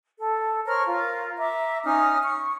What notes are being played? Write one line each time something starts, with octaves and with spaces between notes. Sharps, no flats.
A4
A#4 C5 C#5 F6
F4 A#4
E5 A#5 D6
C#4 D#4 D#6 F6
C#6